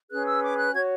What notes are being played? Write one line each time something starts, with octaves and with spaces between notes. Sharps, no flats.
C#4 G#4 B4 F#6
E6
D6
F#6
F#4 C#5 G#6